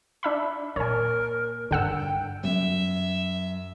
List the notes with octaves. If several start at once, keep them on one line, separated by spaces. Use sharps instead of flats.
D4 E5 B5
A#2 A#4 C#5 G#5
G2 D3 F#5 E6
G5
F#2 E5